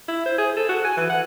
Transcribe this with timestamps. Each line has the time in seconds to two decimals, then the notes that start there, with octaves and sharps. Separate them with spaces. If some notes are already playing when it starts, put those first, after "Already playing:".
0.08 E4
0.26 C5
0.38 G#4
0.56 A4
0.69 F#4
0.85 G#5
0.97 E3
1.10 F#5